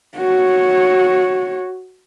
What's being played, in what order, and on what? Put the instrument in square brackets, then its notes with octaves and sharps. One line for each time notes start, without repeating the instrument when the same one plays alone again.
[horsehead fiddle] F#4 C#5